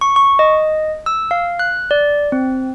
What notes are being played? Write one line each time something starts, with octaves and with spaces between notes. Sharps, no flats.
C#6
C#6
D#5
E6
F5
F#6
D5
C4